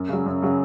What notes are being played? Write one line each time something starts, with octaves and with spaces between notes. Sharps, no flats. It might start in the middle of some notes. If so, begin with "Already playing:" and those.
Already playing: F#2
C#3 F#3
F#2
C#3 F#3